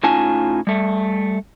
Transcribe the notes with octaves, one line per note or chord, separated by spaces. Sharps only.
A2 C#4 D#4 F4 G#5 A5
G3 A3